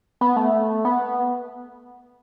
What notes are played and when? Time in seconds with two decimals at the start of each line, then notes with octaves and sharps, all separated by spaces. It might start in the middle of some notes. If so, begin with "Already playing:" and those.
0.21 B3
0.36 A3
0.85 B3